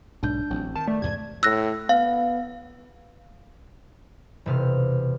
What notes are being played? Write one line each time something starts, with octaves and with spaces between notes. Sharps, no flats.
B1 G#2 D4 G6
A1 F#3 C4
D#3 A5
A3 D5
E2 G#2 C3 G#6
A2 E6 F#6 A#6
B3 F5
E1 C3 F6